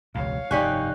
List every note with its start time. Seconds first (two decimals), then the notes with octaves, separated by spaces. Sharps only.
0.15 E1 C#2 G#2 C#5 F5
0.51 F1 G2 D#4 G4 D5 G#5 C#6 F#6